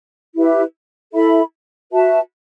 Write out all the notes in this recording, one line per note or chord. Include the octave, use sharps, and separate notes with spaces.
E4 G4 B4 E5
E4 A4 E5 B5
F#4 B4 E5 A5